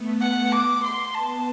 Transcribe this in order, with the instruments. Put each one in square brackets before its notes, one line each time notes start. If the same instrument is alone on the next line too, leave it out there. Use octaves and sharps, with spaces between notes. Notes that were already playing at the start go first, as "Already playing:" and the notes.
Already playing: [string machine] A3 B3
[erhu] F#5
D6
C6
[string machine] B3 [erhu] A5